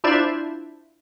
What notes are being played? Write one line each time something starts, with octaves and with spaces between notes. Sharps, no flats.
D4 E4 F4 C5 D5 E5